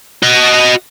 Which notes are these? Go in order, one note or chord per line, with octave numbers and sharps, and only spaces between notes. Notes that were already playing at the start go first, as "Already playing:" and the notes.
F#4 D#5